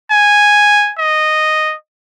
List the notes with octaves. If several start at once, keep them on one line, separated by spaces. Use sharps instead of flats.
G#5
D#5